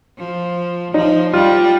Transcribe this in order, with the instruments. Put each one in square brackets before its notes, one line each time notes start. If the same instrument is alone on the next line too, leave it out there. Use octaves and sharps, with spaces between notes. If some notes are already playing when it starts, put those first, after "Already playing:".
[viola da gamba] F3
[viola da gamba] F3 [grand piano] D#4
[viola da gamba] G3 [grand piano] F4